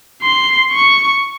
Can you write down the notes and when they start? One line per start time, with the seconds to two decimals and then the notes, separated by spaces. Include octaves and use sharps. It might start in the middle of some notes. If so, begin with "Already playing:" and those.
0.22 C6
0.73 C#6